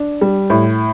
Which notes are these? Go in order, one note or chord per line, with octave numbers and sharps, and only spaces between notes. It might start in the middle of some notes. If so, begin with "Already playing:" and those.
Already playing: D4
G3
A2